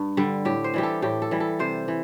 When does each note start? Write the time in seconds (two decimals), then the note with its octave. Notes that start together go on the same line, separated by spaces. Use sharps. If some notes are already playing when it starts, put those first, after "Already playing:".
Already playing: G2
0.17 D3 G3
0.45 A2 G4
0.64 C5
0.74 E3 G3 G4
0.83 A4
1.02 A2 G4
1.22 A4
1.31 E3 G3
1.40 A4
1.59 C3 C5
1.88 E3